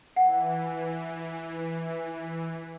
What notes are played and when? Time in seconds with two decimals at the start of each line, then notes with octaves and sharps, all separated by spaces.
0.16 E3 F#5